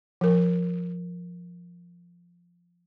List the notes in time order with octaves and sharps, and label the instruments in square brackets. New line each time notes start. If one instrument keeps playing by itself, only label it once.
[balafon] F3 A#4